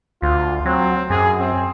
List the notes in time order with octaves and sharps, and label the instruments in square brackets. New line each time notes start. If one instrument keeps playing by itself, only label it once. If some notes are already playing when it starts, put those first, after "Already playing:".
[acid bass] D2 [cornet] F4
[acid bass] F#3 [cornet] C4
[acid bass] F#2 [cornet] G#4
[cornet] C4